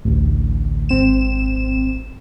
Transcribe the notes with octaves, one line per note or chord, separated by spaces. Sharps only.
A1 D2
G#1 C4 E7